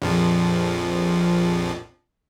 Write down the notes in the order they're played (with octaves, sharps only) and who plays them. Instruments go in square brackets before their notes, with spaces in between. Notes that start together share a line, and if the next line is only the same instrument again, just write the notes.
[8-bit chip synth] A#1 F2 F3